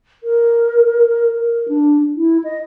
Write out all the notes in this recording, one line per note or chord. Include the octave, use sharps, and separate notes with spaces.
A#4
A#4
D4
E4
D#5